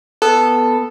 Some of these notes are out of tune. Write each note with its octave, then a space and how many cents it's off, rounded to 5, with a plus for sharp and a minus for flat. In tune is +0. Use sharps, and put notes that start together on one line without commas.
B3 +0 A4 +0